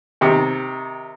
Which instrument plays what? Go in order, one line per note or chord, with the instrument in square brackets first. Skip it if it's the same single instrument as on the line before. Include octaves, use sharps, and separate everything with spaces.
[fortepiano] C3 D#3